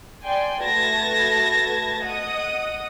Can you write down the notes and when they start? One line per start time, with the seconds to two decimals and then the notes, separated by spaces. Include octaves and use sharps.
0.24 D5 G5 G#5 C6
0.64 A3 F#4 B4 A5 G#6 A#6
2.05 D#5 F#5 D#6